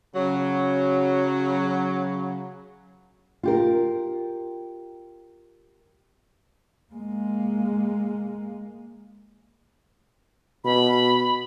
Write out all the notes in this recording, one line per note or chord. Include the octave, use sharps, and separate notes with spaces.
C#3 F#3
F4 G4 A#4
G#3 A#3
B2 B5